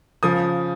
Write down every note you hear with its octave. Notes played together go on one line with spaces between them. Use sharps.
C#3 F3 D#6